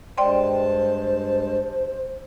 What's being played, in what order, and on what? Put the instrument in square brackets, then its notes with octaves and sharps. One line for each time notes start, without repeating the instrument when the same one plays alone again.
[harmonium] G2 G#3 A5 [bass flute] C5 [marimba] D5 G5 C6